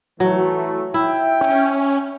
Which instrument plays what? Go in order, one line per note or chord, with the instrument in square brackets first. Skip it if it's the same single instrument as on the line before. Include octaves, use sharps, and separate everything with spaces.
[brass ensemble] E3 A3 [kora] F#3
[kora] E4 [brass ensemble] E5 G5
[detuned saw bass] C#4